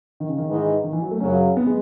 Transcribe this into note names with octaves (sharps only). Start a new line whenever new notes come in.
D#3
C#3
D#3
G#2 E3 G#3 D#4
D#3
E3
F#3
A3
F#2 C#3 F#3 C#4
B3
G#3